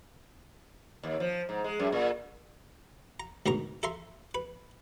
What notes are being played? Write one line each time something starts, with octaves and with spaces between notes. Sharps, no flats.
D#2
F3
G#2
G#3
F#2
A#2
A#5
D2 G#2 B2 A#4 A#5
A4 E5 A#5 C6
B4